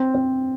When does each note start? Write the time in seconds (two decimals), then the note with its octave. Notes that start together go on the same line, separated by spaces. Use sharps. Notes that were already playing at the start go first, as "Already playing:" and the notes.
Already playing: C4
0.15 C4